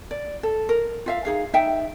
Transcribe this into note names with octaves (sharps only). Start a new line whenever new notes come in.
D5
A4
A#4
F4 E5 F5
D#4 G#4 F5
D#4 E5 G5